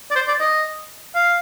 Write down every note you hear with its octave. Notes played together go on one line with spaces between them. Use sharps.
D5
C5
D5
D#5
F5